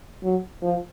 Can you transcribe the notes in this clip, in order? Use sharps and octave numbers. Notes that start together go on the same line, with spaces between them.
F#3
F3